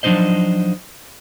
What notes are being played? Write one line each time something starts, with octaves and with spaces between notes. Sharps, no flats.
F3 F#3 D4 D#4 C5 D#5